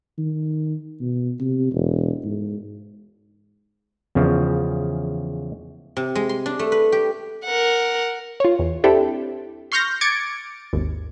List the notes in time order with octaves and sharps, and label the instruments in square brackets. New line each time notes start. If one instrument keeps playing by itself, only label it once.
[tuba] D#3
B2
C3
E1
G#2
[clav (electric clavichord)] E2 C#3 F3
[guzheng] C3
G#3
C6
D4
A3
B4
G4
[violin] A#4 F#5
[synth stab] F4 C#5
E2
C4 D4 E4 G4 A4
C6 C#6 F6 G6 A#6
D6 G#6 A6 C#7 D7
G#1 D#2